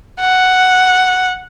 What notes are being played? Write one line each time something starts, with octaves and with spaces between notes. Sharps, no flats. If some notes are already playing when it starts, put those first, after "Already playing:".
F#5